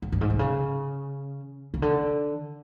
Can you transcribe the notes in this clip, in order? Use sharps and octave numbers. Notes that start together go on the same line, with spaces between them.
G#2
G2
G#2
C3
C#3
C#3
D3